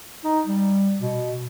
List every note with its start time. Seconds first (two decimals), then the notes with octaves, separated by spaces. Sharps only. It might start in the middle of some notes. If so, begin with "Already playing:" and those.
0.24 D#4
0.46 G3
1.01 B2